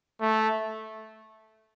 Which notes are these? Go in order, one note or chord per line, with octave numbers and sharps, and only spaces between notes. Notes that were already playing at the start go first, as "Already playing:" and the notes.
A3